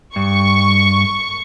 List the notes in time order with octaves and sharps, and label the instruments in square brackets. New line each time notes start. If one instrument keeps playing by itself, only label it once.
[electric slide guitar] G2 [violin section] C#6